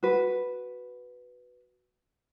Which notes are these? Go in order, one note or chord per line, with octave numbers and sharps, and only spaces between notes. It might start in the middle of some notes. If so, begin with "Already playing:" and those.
F#4 B4